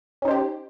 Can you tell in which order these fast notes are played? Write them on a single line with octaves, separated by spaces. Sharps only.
C#4 D#4 C5 G4